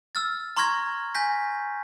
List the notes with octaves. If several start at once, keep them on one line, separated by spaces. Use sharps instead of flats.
E6 F6 A6
A#5 C6 C#6 F6 G#6 A#6
G#5 G6 A#6 B6